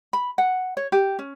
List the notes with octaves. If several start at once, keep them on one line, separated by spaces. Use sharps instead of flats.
B5
F#5
C#5
G4
C#4